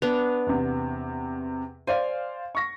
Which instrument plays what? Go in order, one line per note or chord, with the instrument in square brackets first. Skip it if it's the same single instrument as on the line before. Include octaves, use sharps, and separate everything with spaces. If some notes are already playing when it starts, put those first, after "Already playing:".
[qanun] B3 D4 [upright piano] F7
[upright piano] E2 C3
[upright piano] C5 D5 F5 [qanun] G#5
[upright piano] C#6 A#6